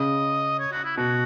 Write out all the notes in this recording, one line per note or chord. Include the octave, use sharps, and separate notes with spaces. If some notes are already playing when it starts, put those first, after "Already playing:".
Already playing: C#3 D#5
C#5
F#4
E4
B2 F#4